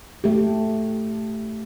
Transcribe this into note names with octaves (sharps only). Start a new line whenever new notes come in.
A3 G4